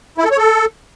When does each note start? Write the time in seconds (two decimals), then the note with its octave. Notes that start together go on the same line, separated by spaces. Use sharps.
0.18 E4
0.24 A4
0.31 C#5
0.38 A4